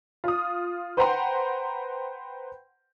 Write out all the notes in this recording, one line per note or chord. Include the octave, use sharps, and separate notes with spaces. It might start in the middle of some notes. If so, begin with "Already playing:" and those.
F4 D#6
B4 C5 F#5 G5 A#5 C6